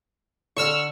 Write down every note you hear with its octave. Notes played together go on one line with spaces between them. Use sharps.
D3 F#5 C#6 E6 F6